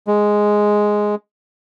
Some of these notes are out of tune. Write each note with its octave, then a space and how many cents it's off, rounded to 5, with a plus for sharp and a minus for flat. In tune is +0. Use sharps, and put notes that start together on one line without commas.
G#3 +0